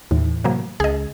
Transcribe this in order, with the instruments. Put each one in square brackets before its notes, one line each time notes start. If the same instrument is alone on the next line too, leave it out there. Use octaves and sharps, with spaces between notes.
[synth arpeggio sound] D#2 [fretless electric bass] A2 E3
[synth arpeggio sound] C3 F#3 A#3
[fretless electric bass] C#2 [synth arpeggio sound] G#4 D#5